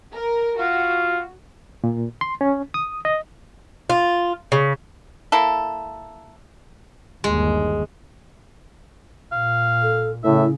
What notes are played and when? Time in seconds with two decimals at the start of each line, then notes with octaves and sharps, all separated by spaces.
0.12 A#4
0.59 F4 F#4
1.84 A#2
2.21 C6
2.41 C#4
2.74 D#6
3.05 D#5
3.90 F4
4.52 C#3
5.32 A#3 E4 A4
7.24 G1 D#2 G#3
9.32 A#2 F5
9.83 A4
10.24 A2 C#3 E4 E5